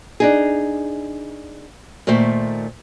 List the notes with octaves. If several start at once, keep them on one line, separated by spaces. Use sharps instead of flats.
D4 D#4 G#4
A#2 D#3 A3 C5 E5